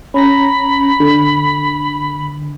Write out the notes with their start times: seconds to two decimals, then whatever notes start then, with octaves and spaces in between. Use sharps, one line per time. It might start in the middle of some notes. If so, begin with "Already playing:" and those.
0.14 C#4 A#5 B5 A#6
1.00 D3